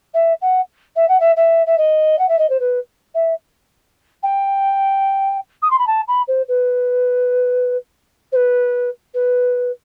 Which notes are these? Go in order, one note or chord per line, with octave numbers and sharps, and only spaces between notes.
E5
F#5
E5
F#5
E5
E5
E5
D#5
F#5
E5
D#5
C5
B4
E5
G5
D#6
C6
B5
A5
B5
C5
B4
C5
B4
B4